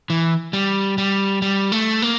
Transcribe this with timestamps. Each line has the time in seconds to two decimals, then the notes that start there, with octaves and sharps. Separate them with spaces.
0.10 E3
0.53 G3
0.98 G3
1.42 G3
1.72 A3
2.02 A#3